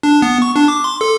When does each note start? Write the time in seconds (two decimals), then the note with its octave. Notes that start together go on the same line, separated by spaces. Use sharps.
0.03 D4
0.22 B3
0.42 C#6
0.56 D4
0.68 D6
0.84 C6
1.01 A4